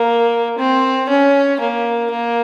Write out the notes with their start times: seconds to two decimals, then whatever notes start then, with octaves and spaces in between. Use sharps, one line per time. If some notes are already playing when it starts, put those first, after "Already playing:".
Already playing: A#3
0.58 C4
1.09 C#4
1.60 A#3
2.11 A#3